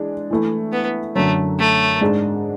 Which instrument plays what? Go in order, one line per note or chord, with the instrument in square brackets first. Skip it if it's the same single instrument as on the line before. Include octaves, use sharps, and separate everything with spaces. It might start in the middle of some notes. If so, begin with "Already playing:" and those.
Already playing: [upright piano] E3 G#3 D4
E3 A3 E4
[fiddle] B3
[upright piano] F#2 D3 F#3 [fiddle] A3
[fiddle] A3
[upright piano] G#2 G#3 D4